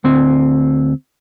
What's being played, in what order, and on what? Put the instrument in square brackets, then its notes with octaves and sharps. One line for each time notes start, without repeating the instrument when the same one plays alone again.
[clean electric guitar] D2 C4